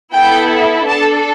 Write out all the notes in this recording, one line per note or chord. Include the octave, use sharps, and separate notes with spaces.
B3 E4 A4 G5
D4 A4 A5